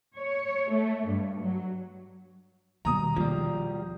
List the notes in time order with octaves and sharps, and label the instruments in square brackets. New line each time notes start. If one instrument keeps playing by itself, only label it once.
[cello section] C#5
A3
G2
F#3
[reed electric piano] D#2 B2 [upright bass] G3 A#3 [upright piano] A#5 D#6
[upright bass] D#3 [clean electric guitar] F3 G3